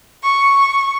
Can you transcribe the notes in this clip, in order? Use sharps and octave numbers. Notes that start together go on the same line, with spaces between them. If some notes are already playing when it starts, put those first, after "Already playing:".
C#6